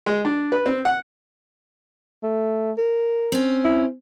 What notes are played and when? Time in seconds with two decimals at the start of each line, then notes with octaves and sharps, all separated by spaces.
0.06 G#3
0.25 D4
0.52 B4
0.66 C4
0.85 F#5
2.23 A3
2.78 A#4
3.32 C4 C#4
3.65 E4